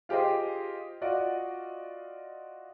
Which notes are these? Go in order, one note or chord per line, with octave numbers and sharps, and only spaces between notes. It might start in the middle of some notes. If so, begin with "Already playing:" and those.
F4 G4 G#4 C5 D#5
F4 F#4 D5 D#5